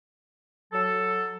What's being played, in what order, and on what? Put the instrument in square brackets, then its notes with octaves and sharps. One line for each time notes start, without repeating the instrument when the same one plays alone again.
[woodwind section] F#3 A4